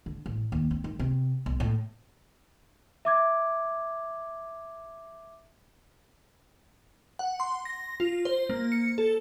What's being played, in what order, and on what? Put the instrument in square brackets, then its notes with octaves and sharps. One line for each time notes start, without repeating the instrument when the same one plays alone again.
[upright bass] D3
A1
D#2
C4
D#3
C3
B1
A2
[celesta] E5 D6 G#6
[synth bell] F#5
C6
A#6
F4
C5
A#3
C#7
A4